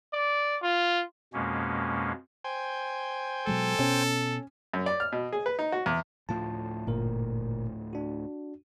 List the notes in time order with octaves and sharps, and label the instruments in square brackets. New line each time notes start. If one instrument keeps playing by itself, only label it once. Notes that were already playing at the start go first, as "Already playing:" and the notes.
[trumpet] D5
F4
[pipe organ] F2 B2 G#3 A#3 C#4
[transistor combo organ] C5 G5 G#5
[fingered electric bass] B2 F#3 G#3 [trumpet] A4
[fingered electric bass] B2 [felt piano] C#4
[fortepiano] F#2
D5
F6
B2
G#4
B4
D#4
F#4
E2
[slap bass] D2 A2 F3 [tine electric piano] F4 A5
[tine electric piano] G1 A#2 A#4
D4 F#4